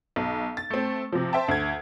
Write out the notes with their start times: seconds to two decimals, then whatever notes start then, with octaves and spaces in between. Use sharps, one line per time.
0.16 B1
0.57 A6
0.71 A3 C4
1.12 C3 F3
1.33 C5 E5 G5 A5
1.48 D2 G#6